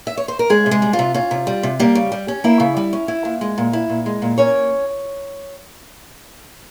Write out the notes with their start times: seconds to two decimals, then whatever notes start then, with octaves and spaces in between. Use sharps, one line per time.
0.07 E5
0.17 C#5
0.28 C5
0.39 A#4
0.50 G#3 C#4 G#4
0.66 C3
0.71 G#3 G#4
0.82 G3
0.93 F4
0.99 C3
1.14 C#4 F4
1.31 C3
1.47 G3
1.63 C3
1.79 G3 A#3 G4
1.95 C#3
2.12 G3
2.28 C#4
2.44 A#3 E4 E5
2.60 C#3
2.77 G3
2.93 C#4
3.08 E4
3.25 A#2
3.41 G#3
3.58 A#2
3.73 E4
3.89 A#2
4.06 G#3
4.22 A#2
4.38 A#3 C#4 C#5